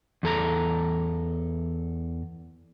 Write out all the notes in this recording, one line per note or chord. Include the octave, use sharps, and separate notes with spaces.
E2 A4 A#5